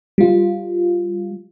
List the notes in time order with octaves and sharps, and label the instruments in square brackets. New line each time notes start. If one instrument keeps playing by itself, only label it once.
[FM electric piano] G3 F4